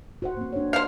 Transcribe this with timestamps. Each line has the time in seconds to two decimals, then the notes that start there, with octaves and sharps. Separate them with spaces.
0.22 F#4 C5 F#5
0.37 A#3 C4
0.53 D4 C#5
0.73 G4 C5 F5